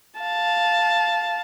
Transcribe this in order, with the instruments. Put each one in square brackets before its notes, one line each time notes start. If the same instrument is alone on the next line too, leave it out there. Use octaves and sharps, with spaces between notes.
[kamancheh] F5 A5